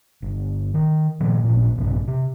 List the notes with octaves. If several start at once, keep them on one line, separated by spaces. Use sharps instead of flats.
G1
D#3
A#2 D#3 F3
A1 A#2
A#1 G2 C3
C3